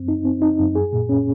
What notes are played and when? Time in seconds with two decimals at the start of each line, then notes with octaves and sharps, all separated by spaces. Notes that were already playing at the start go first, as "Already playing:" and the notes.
Already playing: F#2 C4
0.08 D#4
0.25 C4
0.42 D#4
0.59 F#2
0.75 G#4
0.93 A#2
1.09 C#4